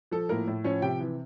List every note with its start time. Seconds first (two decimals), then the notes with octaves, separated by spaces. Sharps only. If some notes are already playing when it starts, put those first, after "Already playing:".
0.11 F3 A4
0.29 A2 A#3 A#4
0.47 A2
0.64 F3 C#4 C#5
0.82 C3 G4 G5
0.99 E3